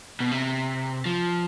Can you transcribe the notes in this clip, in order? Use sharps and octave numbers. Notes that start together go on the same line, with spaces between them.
B2
C3
F3